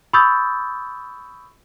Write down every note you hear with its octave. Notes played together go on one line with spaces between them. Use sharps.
B5 C#6 D#6 E6 G6 A6